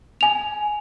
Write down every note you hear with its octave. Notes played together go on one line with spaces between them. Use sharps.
G#5 F7